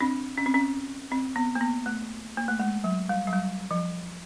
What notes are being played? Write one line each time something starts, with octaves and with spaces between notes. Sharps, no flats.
C4 D4
C#4
C4
C#4
C4
B3
A#3
B3
A3
A#3
A3
G#3
F#3
G3
F#3
G3
F3